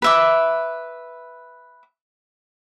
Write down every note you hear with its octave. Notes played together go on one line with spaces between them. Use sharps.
B4 E5 D6